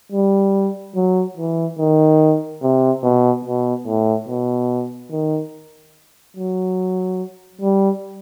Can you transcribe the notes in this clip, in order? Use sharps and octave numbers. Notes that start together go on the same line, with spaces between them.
G3
F#3
E3
D#3
C3
B2
B2
A2
B2
D#3
F#3
G3